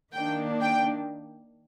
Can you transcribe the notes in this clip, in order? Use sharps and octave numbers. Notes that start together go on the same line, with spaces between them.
D#3 A#3 D4 G5
G5